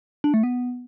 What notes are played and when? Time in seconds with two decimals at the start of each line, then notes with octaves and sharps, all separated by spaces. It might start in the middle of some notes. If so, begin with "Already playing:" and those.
0.24 D4
0.34 A3
0.43 B3